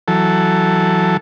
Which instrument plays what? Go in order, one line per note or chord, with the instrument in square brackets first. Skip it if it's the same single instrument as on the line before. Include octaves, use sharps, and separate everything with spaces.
[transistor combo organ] E3 F#3 A4